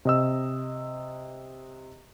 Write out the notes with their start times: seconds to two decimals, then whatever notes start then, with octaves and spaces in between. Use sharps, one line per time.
0.05 C3 D#5 E6